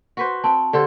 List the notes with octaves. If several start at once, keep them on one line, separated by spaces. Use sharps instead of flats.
F#4 B4 C5
C4 A5
D3 G4 A4 C5